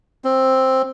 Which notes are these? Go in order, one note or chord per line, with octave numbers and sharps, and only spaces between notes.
C4